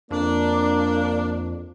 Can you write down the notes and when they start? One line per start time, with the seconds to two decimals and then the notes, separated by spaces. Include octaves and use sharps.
0.11 F2 A#3 D4